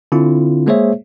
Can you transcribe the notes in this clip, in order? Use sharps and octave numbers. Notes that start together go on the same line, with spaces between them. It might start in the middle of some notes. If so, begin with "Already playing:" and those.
D3 C4 E4 F4
G#3 A#3 G#4 C5 C#5 E5